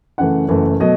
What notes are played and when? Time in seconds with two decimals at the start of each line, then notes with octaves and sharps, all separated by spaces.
0.18 F#2 C#3 E3 A3 F#5
0.48 F#1 F#2 E3 A3
0.80 B2 F#3 A3 D#5